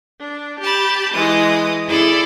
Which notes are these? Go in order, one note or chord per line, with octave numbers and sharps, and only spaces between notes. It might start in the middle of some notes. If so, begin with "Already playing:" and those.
D4
G4 A5 B5
E3 G#3 D#6
E4 G#4 A4 D5